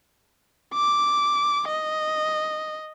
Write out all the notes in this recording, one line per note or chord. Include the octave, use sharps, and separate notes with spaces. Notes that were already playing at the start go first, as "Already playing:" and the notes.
D6
D#5